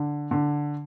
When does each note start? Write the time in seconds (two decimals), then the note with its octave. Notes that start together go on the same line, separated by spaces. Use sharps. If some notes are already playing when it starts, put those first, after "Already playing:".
Already playing: D3
0.31 D3